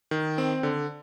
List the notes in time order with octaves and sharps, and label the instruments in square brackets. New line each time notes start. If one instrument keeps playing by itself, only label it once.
[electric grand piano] D#3
C4
D3